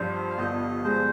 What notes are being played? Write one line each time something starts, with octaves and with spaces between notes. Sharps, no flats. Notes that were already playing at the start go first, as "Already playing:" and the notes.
Already playing: G2 F3 C5
F5
G1 D#5
G#3 C5